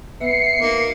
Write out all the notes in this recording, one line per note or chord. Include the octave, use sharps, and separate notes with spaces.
B3 E5 C7 C#7
A#3 D#4 F#4